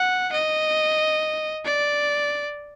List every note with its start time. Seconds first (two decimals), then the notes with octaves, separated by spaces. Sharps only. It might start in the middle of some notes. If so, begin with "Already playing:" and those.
Already playing: F#5
0.33 D#5
1.65 D5